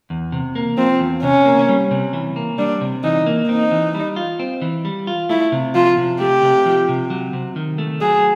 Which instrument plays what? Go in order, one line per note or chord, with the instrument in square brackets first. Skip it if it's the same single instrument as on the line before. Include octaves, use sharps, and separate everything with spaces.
[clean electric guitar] E2
C3
A#3
[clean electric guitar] F3 [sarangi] C4
[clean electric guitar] E2
[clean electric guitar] C3 [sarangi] C#4
[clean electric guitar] A#3
G3
C3
E3
A#3
[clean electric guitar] G3 [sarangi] D4
[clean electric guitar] C3
[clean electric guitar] E3 [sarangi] D#4
[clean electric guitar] A#3
[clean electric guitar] C4 [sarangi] D#4
[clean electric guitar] E3
G3
F4
C4
E3
G3
F4
[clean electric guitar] A3 [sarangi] E4
[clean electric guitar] C3
[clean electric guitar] F3 [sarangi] F4
[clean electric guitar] C3
[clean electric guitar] A3 [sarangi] G4
[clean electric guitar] C3
F3
C3
F#3
C3
D#3
A3
[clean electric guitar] F#3 [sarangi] G#4